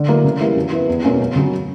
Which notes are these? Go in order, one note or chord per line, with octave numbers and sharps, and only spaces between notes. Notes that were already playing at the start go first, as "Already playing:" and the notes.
Already playing: D3
F#3 A#3 E4
C#3
E3 G3 A#3 E4
F#2
E3 B3 E4
E2
B2 A#3 C#4
F#2
C#3 F#3